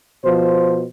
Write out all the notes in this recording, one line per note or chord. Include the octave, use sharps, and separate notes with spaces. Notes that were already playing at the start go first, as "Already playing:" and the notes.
B2 F3 C5